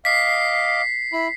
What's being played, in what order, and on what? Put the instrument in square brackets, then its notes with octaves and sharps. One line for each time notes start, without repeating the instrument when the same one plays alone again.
[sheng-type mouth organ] D#5 F5 D6 [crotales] B6 C7
[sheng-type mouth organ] E4 B5